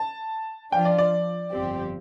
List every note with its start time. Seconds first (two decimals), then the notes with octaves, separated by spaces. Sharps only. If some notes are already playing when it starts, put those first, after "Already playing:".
Already playing: A5
0.72 F3 D4 F4 G5
0.85 D5
0.98 D5
1.51 G1 F2 F3 C4 G4